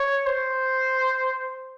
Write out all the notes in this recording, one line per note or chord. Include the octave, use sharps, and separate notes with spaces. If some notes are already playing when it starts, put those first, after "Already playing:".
Already playing: C#5
C5